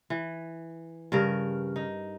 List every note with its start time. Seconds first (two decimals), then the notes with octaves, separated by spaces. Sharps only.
0.10 E3
1.12 G2 C#3 A#4
1.76 D#4